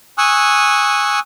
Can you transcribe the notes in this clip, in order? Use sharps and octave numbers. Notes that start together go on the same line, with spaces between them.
G#5 C#6 D#6 E6 F#6